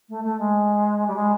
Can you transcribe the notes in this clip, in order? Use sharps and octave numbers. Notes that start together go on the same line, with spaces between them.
A3
A3
G#3
G3
G#3